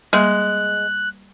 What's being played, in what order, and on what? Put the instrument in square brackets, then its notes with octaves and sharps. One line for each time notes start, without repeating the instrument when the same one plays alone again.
[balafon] G3 A#3 [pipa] G#3 [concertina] F#6